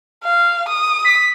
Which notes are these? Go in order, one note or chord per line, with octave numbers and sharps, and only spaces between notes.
F5
D#6
B6